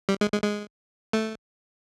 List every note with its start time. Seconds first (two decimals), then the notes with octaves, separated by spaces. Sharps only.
0.09 G3
0.21 G#3
0.33 G#3
0.44 G#3
1.13 A3